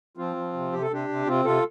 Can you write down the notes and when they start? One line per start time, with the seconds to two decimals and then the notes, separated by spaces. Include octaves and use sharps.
0.17 F3 C4 F4
0.36 F3
0.53 C3
0.72 C3 G4
0.82 A4
0.91 C3 D4 G4
1.08 C3
1.26 C3 C4 F4
1.45 C3 F4 A4